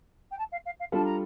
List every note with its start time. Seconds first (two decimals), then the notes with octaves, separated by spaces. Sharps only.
0.31 G5
0.38 A5
0.52 F5
0.65 F5
0.79 F5
0.92 G3 D4 F4 A4 A5
1.04 A#5